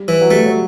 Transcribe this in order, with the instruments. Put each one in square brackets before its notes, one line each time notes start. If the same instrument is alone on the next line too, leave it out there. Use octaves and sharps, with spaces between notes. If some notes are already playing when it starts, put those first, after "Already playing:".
Already playing: [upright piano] G3
[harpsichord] E3
[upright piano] F#3
[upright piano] G3 [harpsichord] A3
[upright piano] F#3